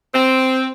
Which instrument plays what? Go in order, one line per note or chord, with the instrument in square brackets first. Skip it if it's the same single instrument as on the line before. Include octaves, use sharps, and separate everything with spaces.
[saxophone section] C4